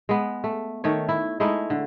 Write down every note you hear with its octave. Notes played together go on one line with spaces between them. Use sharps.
G#3 B3
A3
D#3 A3 C#5
E4
G#3 A3 D#4 E4
D3